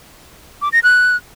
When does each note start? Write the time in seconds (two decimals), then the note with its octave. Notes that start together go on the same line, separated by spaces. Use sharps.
0.62 D6
0.73 A#6
0.83 F#6